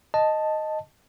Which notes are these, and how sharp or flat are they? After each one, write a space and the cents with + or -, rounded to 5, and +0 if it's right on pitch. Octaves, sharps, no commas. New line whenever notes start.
D#5 +0 A5 +0